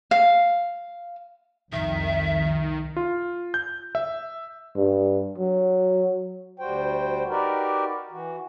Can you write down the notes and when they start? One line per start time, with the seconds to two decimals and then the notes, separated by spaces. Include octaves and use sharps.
0.11 F5
1.73 C2 F2 D#3 E5
2.97 F4
3.54 G6
3.95 E5
4.76 G2
5.38 F#3
6.60 D2 G3 F#4 C5 G5
7.29 D#4 F#4 G4 A#4 B4 D5
8.11 E3 F#4